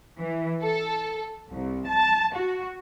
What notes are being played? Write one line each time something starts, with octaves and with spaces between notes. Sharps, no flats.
E3
A4
C2
A5
F#4